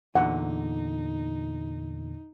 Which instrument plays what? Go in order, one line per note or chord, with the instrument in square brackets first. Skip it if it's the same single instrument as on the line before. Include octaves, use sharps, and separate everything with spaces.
[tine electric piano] E2 A#2 D3 [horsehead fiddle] D#4 [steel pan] F#5